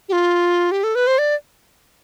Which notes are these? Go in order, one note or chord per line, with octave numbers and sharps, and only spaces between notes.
G4
F4
G4
A4
B4
C5
D5